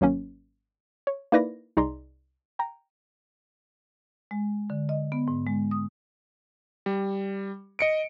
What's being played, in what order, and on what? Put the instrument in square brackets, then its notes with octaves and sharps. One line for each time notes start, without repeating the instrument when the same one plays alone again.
[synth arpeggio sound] G#1 F#3 A#3 C#4
C#5
A#3 D#4 E4 B4 D5 A#6
C2 D#4 G#4 D5 A#5 C6
G5 A#5
[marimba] G#3
D3
D#5
B3
G#2
G#3
D#6
[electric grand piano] G3
D#5 C#7 D7